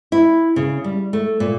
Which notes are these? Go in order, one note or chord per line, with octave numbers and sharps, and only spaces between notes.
E4
C#3
G3
A3
A#2